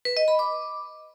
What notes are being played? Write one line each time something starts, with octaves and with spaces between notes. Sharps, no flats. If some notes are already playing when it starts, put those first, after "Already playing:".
B4
D#5
B5
D6